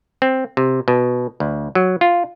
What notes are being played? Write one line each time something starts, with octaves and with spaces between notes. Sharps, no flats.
C4
C3
B2
D2
F#3
F4